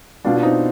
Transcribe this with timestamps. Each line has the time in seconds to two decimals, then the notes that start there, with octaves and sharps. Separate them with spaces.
0.25 B2 B3 D4 F4
0.36 F4
0.43 C4 D#4